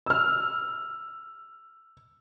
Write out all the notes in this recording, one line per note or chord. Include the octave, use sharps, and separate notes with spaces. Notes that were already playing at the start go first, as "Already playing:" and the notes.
E6 F6